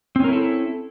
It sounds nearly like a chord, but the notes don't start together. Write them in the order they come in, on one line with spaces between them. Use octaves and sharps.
C4 C#4 A#4 E4 A4